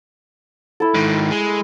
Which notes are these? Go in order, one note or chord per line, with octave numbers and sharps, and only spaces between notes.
E4 A4
G#2 D#3
G#3